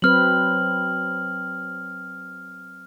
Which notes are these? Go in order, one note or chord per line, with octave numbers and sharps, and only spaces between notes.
F#3 C4 B4 F6 F#7